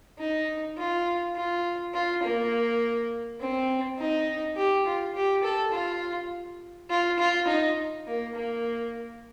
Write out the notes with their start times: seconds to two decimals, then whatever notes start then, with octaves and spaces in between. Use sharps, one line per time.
0.18 D#4
0.77 F4
1.36 F4
1.94 F4
2.22 A#3
3.40 C4
3.98 D#4
4.56 G4
4.86 F4
5.15 G4
5.44 A4
5.73 F4
6.90 F4
7.19 F4
7.47 D#4
8.07 A#3
8.35 A#3